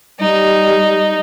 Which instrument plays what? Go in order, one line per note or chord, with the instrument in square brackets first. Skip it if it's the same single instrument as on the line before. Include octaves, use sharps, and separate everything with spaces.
[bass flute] G3 [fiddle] D#4